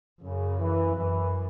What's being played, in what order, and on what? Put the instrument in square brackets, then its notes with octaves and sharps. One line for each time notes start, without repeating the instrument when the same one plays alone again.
[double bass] F#2 [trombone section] C#3
[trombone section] E3
[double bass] F#2 [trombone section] E3